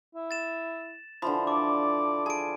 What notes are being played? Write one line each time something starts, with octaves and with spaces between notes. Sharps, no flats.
E4
A6 E7
D3 E3 F3 A5 B5
D5 D6
G#4 A5 D7